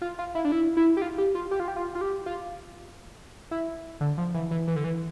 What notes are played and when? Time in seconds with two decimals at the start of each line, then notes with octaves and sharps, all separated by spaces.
0.02 F4
0.19 F4
0.35 E4
0.45 D4
0.52 E4
0.77 E4
0.97 G4
1.02 F4
1.18 G4
1.35 F4
1.51 G4
1.60 F4
1.68 G4
1.76 F4
1.95 F4
2.01 G4
2.26 F4
3.51 E4
4.01 D3
4.18 F3
4.34 E3
4.51 E3
4.68 E3
4.76 D3
4.84 E3